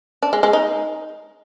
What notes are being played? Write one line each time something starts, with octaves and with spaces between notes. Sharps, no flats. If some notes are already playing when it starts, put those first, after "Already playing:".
D4
G#3
G#3
D#4